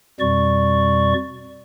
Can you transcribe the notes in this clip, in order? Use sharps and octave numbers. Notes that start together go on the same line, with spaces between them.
F2 B2 G3 D5 C#6